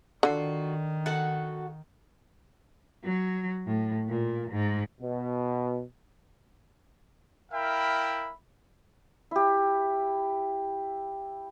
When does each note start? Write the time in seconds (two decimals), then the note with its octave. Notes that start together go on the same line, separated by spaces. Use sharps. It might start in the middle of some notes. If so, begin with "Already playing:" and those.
0.23 D3 D#3 F4 F#4
1.06 F#4 A4 F#5
3.05 F#3
3.66 A2
4.08 A#2
4.50 G#2
5.01 B2
7.52 E4 A#4 E5 F5 G5 B5
9.31 E4 G4